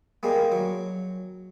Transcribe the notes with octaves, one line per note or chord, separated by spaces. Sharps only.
G3 G#3 A#3
F#3